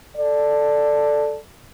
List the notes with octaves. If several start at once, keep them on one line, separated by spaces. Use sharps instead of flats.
A4 D5